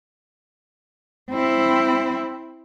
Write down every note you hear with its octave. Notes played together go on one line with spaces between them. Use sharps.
C4 E4